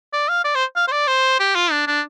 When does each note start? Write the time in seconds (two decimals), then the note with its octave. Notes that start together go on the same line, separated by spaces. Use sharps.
0.13 D5
0.28 F5
0.44 D5
0.55 C5
0.76 F5
0.88 C5
0.91 D5
1.07 C5
1.39 G4
1.55 F4
1.71 D4
1.87 D4